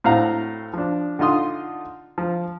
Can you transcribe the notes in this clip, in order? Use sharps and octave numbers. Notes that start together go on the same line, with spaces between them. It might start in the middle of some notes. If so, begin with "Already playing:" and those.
A2 C4 F#4 F5 F#5 A#5
F3 D4
D3 D#4 F4 C6 D#6
F3